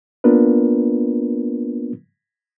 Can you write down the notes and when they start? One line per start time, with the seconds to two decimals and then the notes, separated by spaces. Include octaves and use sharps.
0.24 A#3 B3 D4 F4 A#4 B4